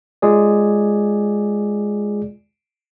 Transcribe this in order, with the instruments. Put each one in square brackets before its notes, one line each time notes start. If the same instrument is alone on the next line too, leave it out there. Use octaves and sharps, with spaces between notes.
[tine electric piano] G#3 F4 G#4 D5